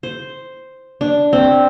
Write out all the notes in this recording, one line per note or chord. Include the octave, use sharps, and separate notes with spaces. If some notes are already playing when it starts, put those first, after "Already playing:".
C5
D4
C4